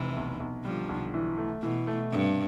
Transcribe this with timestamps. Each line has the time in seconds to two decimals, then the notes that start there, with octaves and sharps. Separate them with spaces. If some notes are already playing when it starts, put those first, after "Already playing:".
Already playing: F1 C3 E3
0.16 B1
0.40 B1
0.65 D3 F3 G3
0.89 B1
1.14 E3
1.38 A3
1.62 B2 E3
1.87 A3
2.12 G2 C3